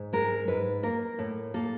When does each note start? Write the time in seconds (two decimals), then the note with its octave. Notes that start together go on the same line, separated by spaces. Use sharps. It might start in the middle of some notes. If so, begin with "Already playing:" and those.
Already playing: G#2
0.13 G#3 A#4
0.48 G#2 B4
0.83 A#3 A#4
1.19 A2
1.54 A#3 A4